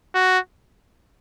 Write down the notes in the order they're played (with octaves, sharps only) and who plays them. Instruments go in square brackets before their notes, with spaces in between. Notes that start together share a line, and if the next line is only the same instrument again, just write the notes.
[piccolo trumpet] F#4